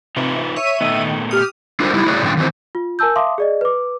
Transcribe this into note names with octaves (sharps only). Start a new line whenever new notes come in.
C3 D#4 F4 B4
C#5 E5 D#7
A#2 D#3 A3 B3
G4 D#6 F6
D4 F4 F#4 A4 A#4 C5
G3 D#4 E4 G4
A3 E4 F#4 G#4 C#5 D5
A2 D3 F3 C#4 G5
D#3 E3 C4 F#4 B4 C5
F4
A#4 G#5 A5 E6 G6
E5 F5 A5 C6 D6 D#6
G#4 D5 D#5
B4 D6